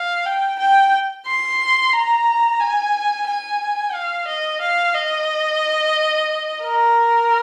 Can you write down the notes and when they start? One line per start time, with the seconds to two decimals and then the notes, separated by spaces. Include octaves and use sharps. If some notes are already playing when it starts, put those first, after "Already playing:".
Already playing: F5
0.26 G5
0.59 G5
1.27 C6
1.93 A#5
2.60 G#5
3.27 G#5
3.94 F5
4.28 D#5
4.61 F5
4.94 D#5
6.62 A#4